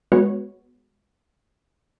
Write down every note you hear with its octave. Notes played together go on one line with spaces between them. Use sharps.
G#3 B3 F#4 B4 C#5